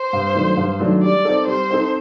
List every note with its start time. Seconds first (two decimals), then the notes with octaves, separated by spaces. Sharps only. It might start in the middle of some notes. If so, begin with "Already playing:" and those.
Already playing: C5
0.13 G2
0.35 D#3 F#3 A3 D4
0.57 G2
0.80 D#3 F#3 A3 D4
1.03 G3 D5
1.25 C4 D#4 A4
1.47 G3 C5
1.71 C4 D#4 A4